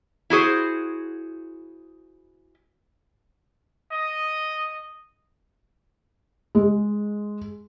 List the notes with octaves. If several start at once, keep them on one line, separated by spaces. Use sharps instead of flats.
E4 F#4 G#4 C5
D#5
G#3